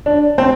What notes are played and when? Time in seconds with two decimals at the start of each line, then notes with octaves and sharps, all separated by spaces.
0.06 D4
0.38 C4